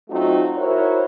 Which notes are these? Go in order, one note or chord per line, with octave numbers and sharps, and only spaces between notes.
F#3 A3 C4 D#4 F4 F#4
E4 F#4 A#4 C5 C#5